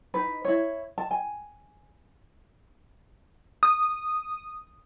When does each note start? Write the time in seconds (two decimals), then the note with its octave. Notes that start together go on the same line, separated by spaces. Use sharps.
0.14 D#4 B4
0.45 E4 C#5
0.98 A5
1.11 G#5
3.63 D#6